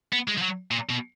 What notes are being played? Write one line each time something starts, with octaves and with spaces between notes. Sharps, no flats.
B3
G#3
F3
F#3
A#2
B2